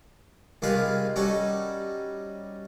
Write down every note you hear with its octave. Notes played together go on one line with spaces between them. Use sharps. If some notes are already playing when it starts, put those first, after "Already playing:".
C2 D#3 G#3 F4 B4 F5
G3 C#4 D#4 F#4 A4